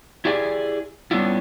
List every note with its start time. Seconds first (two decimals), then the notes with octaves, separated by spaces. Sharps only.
0.25 E4 G4 G#4 D5 G5 G#5
1.11 G3 B3 C#4 D4 E4 F4